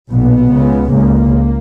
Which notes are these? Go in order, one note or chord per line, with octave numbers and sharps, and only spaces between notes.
B1 A#2 B3
C#2 C#3
C#2 C#3 A#3